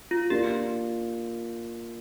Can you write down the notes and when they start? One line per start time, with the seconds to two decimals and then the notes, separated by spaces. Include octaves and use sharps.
0.11 F4
0.30 A#3 D4 F4 G4